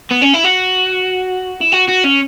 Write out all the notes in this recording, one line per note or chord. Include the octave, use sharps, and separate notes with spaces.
B3
C#4
E4
F#4
E4
F#4
F#4
C#4